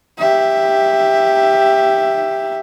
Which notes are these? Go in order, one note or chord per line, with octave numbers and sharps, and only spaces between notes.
G4 E5